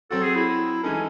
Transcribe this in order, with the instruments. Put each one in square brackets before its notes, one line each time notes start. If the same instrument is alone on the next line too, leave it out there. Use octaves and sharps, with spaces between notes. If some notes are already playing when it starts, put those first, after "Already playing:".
[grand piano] F#3 C4 F#4 [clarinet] A4
[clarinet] G#4
E4
[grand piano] E3 G#3 D#4 A4 [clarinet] C#4